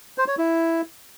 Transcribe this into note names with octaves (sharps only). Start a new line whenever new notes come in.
C5
C#5
E4